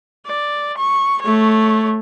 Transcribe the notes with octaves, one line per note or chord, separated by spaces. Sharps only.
D5
C#6
A3 C#5